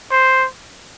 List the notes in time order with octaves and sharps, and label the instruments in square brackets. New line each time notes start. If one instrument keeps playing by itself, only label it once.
[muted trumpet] C5